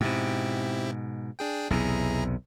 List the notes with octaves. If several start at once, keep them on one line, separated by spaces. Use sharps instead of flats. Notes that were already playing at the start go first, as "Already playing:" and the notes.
G#2 B2 C4 E4 G4
D4 G#4 G5
B1 E2 C3 E4 G#4 A#5